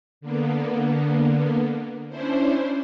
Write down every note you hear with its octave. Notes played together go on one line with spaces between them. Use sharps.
D3 A#3 B3
C#4 D4 E4 C5